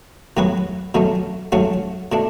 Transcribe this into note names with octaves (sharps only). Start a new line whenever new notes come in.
A2 F#3 B3 F#4 B4
B2 F#3 A3 C#4
G#2 F#3 A3 C#4 F#4
B2 A3 D4